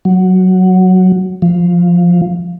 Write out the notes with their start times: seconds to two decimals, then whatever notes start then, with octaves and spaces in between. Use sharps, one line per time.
0.05 F#3
1.42 F3